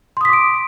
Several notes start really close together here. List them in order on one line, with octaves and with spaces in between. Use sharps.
C6 D#6 B6 D6 D7